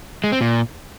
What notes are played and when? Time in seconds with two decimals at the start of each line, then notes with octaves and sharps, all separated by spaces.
0.24 G#3
0.32 C4
0.41 A#2